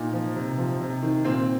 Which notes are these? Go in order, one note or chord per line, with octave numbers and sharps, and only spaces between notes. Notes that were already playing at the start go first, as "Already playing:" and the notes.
Already playing: A#2 D#4
F3
C3
F3
C3
D#3
A#2 C4